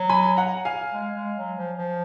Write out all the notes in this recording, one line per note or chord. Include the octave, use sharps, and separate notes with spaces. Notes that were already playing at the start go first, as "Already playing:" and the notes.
Already playing: F#3
G#5 B5
F#5 A#5
F5 G#5
G#3
G#3
F#3
F3
F3